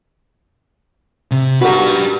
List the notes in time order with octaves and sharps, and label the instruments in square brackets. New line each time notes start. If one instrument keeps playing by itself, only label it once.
[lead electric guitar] C3
[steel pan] F#4 A#4 [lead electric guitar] G4 B4